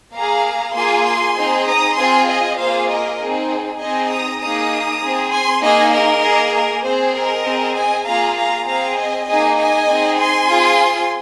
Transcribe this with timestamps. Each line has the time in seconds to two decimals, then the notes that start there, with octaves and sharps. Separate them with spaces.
0.14 A#3 G#4 F5 A#5
0.75 A#3 F4 G#4 G#5 C6
1.05 G#5 C6
1.36 C4 D#4 G#4
1.67 A#5 D#6
1.97 C4 F4 G#4 G#5 C6
2.27 D#5 G#5
2.58 A#3 F4 G#4 C5 F5
2.88 A#4 D#5
3.19 C4 D#4 G#4
3.80 C4 D#4 G#4 D#5 G#5
4.10 A#5 D#6
4.41 A#3 D#4 G#4 A#5 D#6
5.02 C4 G#4
5.32 G#5 C6
5.62 A#3 D#4 G#4 D#5 G#5
5.93 A#4 D#5
6.24 A#3 G#4
6.54 A#4
6.84 C4 G#4 C5
7.15 A#4 D#5
7.46 C4 G#4
7.76 D#5 G#5
8.06 A#3 F4 G#4 F5 A#5
8.37 F5 A#5
8.67 C4 G#4 F5 A#5
8.98 D#5 G#5
9.28 A#3 D#4 G#4 D#5 G#5
9.59 D#5 G#5
9.89 C4 D#4 G#4
10.20 G#5 C6
10.50 C4 F4 G#4